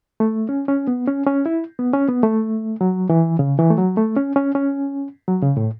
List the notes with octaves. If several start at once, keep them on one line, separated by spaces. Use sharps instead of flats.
A3
C#4
C#4
B3
C#4
C#4
E4
B3
C#4
B3
A3
F#3
E3
C#3
E3
A3
F#3
A3
C#4
C#4
C#4
F#3
C#3
A2